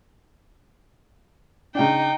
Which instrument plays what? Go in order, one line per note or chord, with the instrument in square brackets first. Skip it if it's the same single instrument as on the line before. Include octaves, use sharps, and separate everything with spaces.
[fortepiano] C#3 D4 [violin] D#4 G5